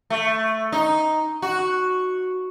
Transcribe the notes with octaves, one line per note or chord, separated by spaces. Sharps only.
A3
D#4
F#4